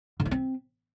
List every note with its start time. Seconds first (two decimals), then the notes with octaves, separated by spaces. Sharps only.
0.20 D3
0.25 E4
0.31 C4